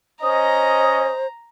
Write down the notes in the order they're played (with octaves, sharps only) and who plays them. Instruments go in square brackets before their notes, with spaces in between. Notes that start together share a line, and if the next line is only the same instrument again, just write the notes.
[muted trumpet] C#4 [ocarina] C5 [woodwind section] D#5 [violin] A#5